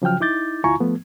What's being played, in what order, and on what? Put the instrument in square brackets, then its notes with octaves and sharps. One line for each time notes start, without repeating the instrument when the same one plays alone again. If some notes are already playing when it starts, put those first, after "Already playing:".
[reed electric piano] C#3 F3 F#3 G5 F6
D#4 E4 D6 G6 A6
D2 E4 F4 G#5 A#5 C#6
F3 A3 B3